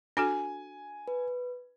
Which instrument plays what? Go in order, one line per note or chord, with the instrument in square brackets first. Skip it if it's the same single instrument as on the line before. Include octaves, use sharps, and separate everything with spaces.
[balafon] D4 F#4 A4 [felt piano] G#5
[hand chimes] B4